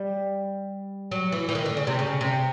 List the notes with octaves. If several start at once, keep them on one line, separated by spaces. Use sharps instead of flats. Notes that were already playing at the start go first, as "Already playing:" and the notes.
Already playing: G3
F#3
E3
E3
D#3
D3
C#3
C3
C#3
C3